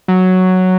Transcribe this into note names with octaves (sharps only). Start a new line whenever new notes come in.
F#3